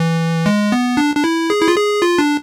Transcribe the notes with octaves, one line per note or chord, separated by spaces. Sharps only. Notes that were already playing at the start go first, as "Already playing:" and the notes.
Already playing: E3
G#3
B3
D4
D4
E4
G#4
E4
F4
G#4
F4
D4